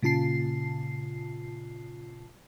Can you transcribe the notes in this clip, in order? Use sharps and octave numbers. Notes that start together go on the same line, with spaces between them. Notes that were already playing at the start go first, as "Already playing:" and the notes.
A#2 C#3 F4 A5 C7